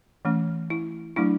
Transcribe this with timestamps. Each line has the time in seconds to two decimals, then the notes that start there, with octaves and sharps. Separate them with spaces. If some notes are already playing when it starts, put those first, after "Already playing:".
0.25 E3 A3 C#4
0.70 E4
1.16 F#3 A3 D4 E4